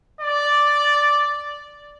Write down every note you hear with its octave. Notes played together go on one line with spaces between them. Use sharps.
D5